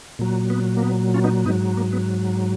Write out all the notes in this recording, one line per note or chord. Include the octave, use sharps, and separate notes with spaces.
A#2 F#3
B3
A#3
B3
C#4 F4
B3 D#4
G#2 F#3 B3 D#4
A#3
B3